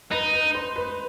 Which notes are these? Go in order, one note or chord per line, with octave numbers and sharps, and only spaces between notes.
D#4 B4
B4
C5
B4